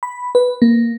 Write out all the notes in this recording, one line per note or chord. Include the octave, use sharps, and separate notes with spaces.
B5
B4
A#3